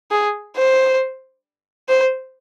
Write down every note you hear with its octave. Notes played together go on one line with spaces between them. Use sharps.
G#4
C5
C5